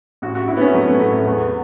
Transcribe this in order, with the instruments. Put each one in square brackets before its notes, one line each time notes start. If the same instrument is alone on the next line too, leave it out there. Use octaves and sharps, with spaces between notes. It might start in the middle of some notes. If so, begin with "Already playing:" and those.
[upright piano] A1 F#4
F#4
A2 E4
B3
C#4
F#3 A3
B3
A1 A3
A3
E2 B3